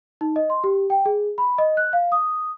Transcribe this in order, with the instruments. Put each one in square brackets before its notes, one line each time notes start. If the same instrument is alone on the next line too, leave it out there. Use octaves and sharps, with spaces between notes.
[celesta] D#4
D#5
C6
G4
G5
G#4
B5
D#5
F#6
F5
D#6